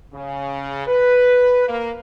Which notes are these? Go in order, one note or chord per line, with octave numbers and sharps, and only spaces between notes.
C#3
B4
A#3